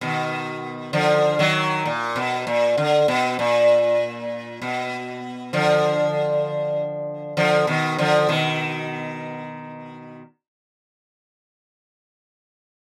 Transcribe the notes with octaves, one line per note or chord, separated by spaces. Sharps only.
B2 D#3
D3 F3
D#3 F#3
A#2
B2
A#2
D3
B2
A#2
B2
D3 F3
D3 F3
B2 D#3
D3 F3
B2 D#3